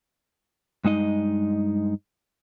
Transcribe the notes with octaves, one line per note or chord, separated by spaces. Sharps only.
G2 G#3 D#4 D#5